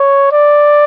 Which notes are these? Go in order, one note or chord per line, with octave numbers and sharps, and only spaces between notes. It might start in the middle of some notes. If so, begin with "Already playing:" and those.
Already playing: C#5
D5